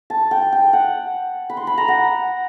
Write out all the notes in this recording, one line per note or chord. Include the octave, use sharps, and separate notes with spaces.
A5
G5
G5
F#5
B5
C6
B5
A#5
F#5